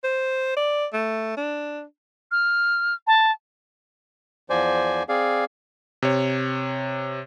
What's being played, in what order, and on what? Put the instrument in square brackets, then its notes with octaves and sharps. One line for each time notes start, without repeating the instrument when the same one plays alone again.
[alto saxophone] C5
D5
A3
D4
[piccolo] F6
A5
[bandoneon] E2 F3 C5 D5 G#5
C4 G#4 D5 F5
[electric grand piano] C3 C#5